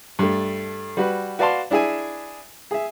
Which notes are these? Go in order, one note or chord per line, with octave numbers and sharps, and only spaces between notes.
G2 A3
G3 F#4 B4
F#4 B4 D5 F5 A5 C6
D4 E4 G#4 E5 G#5
G#4 E5